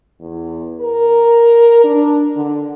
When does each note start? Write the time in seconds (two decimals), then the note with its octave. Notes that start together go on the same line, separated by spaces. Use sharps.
0.20 E2
0.81 A#4
1.84 D4
2.36 D3